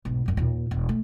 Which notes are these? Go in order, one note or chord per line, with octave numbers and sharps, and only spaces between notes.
B1 G#2
F#2 G#3
D#2 A#2
E1
A3